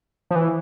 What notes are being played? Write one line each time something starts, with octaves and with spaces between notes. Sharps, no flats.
F3
E3